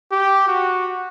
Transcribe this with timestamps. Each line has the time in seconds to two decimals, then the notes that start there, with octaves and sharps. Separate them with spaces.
0.12 G4
0.48 F#4